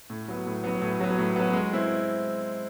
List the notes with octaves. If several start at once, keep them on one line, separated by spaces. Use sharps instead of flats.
A2
F#3 B3
A2
F#3 B3
A2
F#3 B3
A2
F#3 B3
G#3
C4 E4